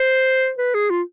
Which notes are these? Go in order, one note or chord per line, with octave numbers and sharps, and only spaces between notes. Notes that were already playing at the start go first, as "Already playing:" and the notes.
Already playing: C5
B4
G#4
F4